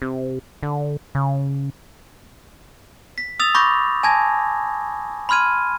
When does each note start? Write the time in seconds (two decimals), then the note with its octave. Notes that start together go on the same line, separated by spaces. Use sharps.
0.02 C3
0.63 D3
1.15 C#3
3.18 B6
3.40 D#6 E6 A6 F7
3.55 B5 C#6 D6 G6 A#6
4.03 G#5 A5 G#6 A#6
5.29 B5 C6 F6 G#6 D#7